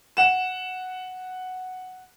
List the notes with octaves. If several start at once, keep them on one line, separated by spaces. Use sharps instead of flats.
F#5 E7